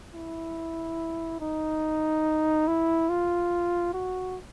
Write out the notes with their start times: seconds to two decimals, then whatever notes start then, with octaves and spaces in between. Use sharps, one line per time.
0.14 E4
1.41 D#4
2.68 E4
3.10 F4
3.94 F#4